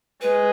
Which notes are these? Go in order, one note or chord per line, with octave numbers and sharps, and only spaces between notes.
G#3 B4